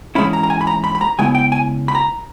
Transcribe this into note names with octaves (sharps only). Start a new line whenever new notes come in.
G#2 E3 G#3 C#4 E4 B5
A#5
A#5
G#5
B5
A#5
B5
B5
A#5
C#3 G#3 B3 E4 G#5
G5
G#5
B5
A#5